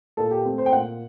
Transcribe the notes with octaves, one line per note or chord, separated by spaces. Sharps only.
A#2 A4
G4
A3 C4
C5
G5
A#2 F#5